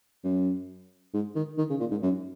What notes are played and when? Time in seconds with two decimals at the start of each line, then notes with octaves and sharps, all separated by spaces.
0.24 F#2
1.14 G#2
1.35 D#3
1.58 D#3
1.70 C#3
1.80 A#2
1.91 G#2
2.03 F#2